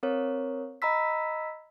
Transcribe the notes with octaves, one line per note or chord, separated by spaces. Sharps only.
C4 A#4 C#5
D#5 A#5 B5 E6 B6